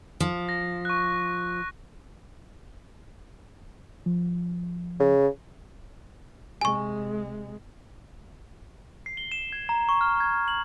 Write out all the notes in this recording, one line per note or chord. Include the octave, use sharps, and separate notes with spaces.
F3
A#6
C#6 F#6
F3
C#3
C3 G#3 G#5 C#6
C7
G7
E7
G#6
A#5
C#6
F6
G#6
F6
F#7